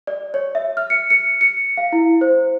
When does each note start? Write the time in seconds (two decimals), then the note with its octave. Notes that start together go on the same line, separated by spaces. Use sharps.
0.07 D5
0.34 C#5
0.55 E5
0.77 F6
0.90 C#7
1.10 C#7
1.41 C#7
1.77 F5
1.92 E4
2.21 C5